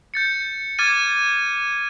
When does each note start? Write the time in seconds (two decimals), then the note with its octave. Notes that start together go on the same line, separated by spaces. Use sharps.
0.14 G6 A6 C#7
0.79 D6 F6 G#6 A6 D#7